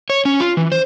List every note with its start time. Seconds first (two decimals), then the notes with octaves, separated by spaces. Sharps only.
0.10 C#5
0.25 C#4
0.40 F4
0.57 E3
0.72 C5